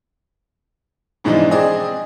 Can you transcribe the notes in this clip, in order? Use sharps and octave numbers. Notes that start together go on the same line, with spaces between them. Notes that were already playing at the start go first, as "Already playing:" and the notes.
G#2 B2 E3 F3 D4 D#4
C4 G#4 D5 D#5